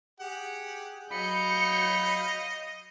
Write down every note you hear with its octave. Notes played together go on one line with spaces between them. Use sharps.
G4 G#4 F#5
F#3 D#5 F5 B5 G6 C#7